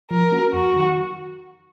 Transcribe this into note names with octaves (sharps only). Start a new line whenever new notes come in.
F3 A#4
A#3 C#4 F#4
F2 F#4
D#3 F#3